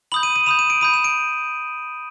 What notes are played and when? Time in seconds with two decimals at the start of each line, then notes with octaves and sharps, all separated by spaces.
0.12 B5 D#6 G6 F#7
0.23 D#7
0.36 D#7
0.46 B5 D#6 G6 E7
0.59 D#7
0.70 D7
0.81 B5 D#6 G6 D#7
0.94 E7
1.04 D7